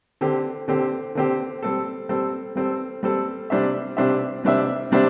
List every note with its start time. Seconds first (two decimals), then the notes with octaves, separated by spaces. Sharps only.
0.21 D3 C4 G4
0.68 D3 C4 G4
1.15 D3 C4 G4
1.62 G3 C4 A4
2.09 G3 C4 A4
2.56 G3 C4 A4
3.03 G3 C4 A4
3.50 C3 G3 D4 C5 E5
3.97 C3 G3 D4 C5 E5
4.43 C3 G3 D4 C5 E5
4.91 C3 G3 D4 C5 E5